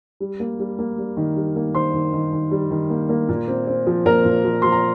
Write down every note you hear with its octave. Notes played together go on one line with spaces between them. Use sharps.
G3
A#3
G3
A#3
G3
D#3
G3
A#3
D#3 C5 C6
D#3
D#3
D#3
G3
D#3
A#3
A#3
A#2
C4
C4
F3
A#2 A#4 A#5
A#2
F3
F3 C6
A#5